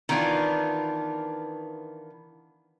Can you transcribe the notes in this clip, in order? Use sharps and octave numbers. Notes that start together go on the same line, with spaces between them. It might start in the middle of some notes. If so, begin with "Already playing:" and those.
D#3 E3 B3 D4 F4